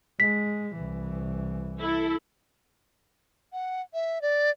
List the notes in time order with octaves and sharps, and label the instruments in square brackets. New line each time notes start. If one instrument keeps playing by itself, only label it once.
[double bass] G#3 [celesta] B6
[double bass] C2 E3
[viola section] E4 A4
[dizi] F#5
E5
D5